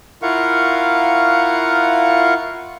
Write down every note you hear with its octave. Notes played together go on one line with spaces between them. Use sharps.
E4 F4 A#4 F5 F#5 C#6